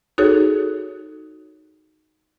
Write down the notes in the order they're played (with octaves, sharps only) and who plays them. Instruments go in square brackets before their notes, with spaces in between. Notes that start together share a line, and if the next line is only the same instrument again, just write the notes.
[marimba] D#4 F#4 G#4 A4 C#5